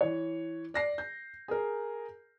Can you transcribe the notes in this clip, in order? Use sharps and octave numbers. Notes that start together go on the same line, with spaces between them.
E3 C#5
D5 A#6 C7
G6
G#4 A#4